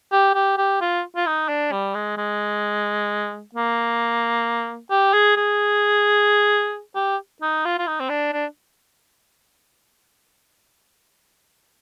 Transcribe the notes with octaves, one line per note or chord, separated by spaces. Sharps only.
G4
G4
G4
F4
F4
D#4
D4
G3
G#3
G#3
A#3
G4
G#4
G#4
G4
D#4
F4
F4
D#4
C4
D4
D4